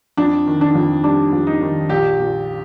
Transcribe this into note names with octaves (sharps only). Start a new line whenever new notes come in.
F2 D4
D#3
D4
F2
G3 D4
F2
D#4
D#3
A#1 G4
A#2